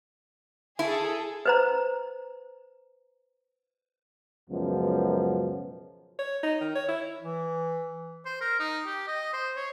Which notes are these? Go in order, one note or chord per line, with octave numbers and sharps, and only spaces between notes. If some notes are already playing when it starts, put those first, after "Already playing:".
E4 G#4 A4
B4 C5 A#5
C#2 F#2 B2 F3
C#5
D#4
D#3
C#5
E4
E3
C5
A#4
D#4
G4
D#5
C5
C#5